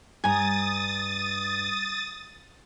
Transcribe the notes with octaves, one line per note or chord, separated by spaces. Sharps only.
G2 G#5 A#5 D#6 A6